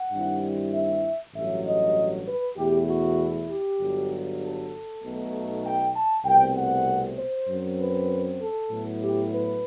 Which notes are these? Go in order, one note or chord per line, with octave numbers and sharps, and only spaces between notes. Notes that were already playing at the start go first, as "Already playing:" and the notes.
Already playing: F#5
G2 D#3 G3 C4 E4
E5
A1 G2 F#3 E5
D#5
B4
E2 B2 A3 E4 G4
F#4
G4
G1 G2 F#3
A4
B1 B2 A3 D#4
G5
A5
C2 B2 A3 C4 G5
F#5
C5
F#2 F#3 C4
B4
A4
A2 F#3 B3 E4
G4
B4